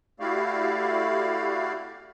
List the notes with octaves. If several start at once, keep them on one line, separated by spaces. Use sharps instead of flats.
A3 E4 F#4 G4 D5 F5